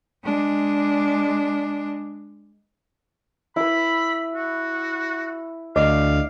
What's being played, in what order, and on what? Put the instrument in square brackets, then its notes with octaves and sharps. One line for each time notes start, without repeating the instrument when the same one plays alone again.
[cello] G#3 D4
[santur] E4 B4 [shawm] B5
[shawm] F#4
[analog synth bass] D2 [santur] D5 [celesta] D#5 [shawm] F5